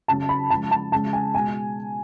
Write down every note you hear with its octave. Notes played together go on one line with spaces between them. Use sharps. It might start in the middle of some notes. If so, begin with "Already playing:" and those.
C#3 F#3 A5
B5
C#3 F3 G#3 A5
A5
C#3 G#3 A5
G#5
B2 G#3 G#5